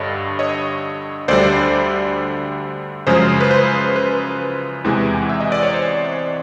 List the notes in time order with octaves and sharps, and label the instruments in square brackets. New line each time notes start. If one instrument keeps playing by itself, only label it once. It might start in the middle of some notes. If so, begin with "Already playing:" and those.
Already playing: [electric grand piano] G2 D3 G3 C#5 D#5
C#5 D#5
D2 D3 G3 C5 D5
F#2 C#3 F3 G#3 C5
B4
C5
B4
E2 C3 E3 G#3
E5
D#5
D5
C#5
C5